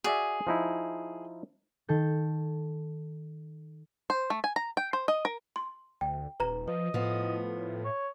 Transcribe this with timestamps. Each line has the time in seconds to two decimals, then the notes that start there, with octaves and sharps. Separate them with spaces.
0.04 F#4 G#4 D5 E5
0.47 F3 D#4 E4
1.89 D#3 A4 G6
4.10 C5
4.30 A3
4.44 G#5
4.56 A#5
4.77 G5
4.93 C5
5.08 D#5
5.25 A#4
5.56 C6
6.01 D2 G5
6.40 D#1 B4 A#5
6.68 F3 B4 D#5
6.94 A2 F3 B3
7.84 C#5